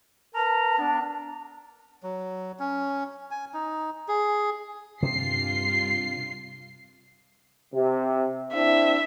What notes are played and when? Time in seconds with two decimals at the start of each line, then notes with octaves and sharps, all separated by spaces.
0.35 A#4 B4 A5 A#5
0.79 B3 D4
2.03 F#3
2.60 C#4
3.31 G#5
3.54 D#4
4.08 G#4
5.03 G2 C3 F4 C7
7.73 C3
8.53 C4 D4 E4 E5